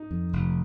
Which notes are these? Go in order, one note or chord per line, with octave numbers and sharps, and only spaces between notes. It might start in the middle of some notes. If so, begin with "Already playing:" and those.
Already playing: D#4
F2
F1